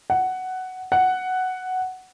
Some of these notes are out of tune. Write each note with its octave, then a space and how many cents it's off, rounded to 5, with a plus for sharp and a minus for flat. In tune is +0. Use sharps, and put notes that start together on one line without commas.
F#5 +10
F#5 +5